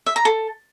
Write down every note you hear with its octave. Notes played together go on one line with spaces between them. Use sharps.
E5
A#5
A4